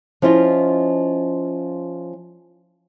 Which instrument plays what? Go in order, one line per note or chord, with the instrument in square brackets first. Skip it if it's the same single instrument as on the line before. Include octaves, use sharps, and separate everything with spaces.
[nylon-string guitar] F3 C#4 E4 F4 D#5